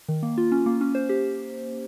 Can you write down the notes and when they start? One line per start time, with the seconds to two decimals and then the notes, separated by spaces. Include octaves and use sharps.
0.09 D#3
0.23 A#3
0.38 F4
0.52 C#4
0.66 A#3
0.81 C#4
0.95 C5
1.09 G4